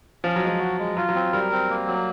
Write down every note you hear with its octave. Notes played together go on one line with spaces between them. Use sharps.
F3 C#4
F#3
F3 G#3
F#4
G#3
F#3 F4
F#3
C4
G3 A#4
C4
A#3
F#3